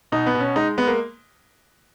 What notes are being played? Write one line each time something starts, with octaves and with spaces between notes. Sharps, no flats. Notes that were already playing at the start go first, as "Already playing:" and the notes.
B2 D#4
B3
B2
C#4
G#3 D#4
G#3 B3
A#3